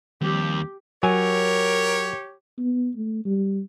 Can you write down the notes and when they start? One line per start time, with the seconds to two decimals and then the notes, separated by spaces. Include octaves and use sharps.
0.21 D#2 F3 G3 C4 G4
1.03 F#3 G4 A#4 C#5 G#5
2.58 B3
2.96 A3
3.25 G3